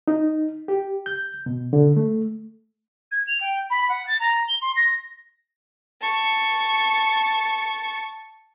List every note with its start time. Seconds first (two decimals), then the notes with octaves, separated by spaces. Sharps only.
0.08 D#4
0.68 G4
1.06 G6
1.46 B2
1.73 D3
1.97 A3
3.11 G#6
3.27 F7
3.40 G5
3.70 B5
3.89 F#5
4.07 A6
4.19 A#5
4.48 G7
4.61 C6
4.76 A#6
6.01 A5 C#6